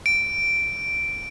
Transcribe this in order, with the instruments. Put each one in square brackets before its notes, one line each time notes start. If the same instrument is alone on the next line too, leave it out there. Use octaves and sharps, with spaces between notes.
[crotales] D7